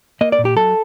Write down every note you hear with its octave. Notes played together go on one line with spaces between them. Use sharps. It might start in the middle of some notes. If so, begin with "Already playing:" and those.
A#3 D#5
D5
A#2
G4
F#3 A4